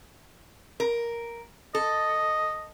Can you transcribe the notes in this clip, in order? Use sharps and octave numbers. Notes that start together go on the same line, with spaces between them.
A#4
A4 D#5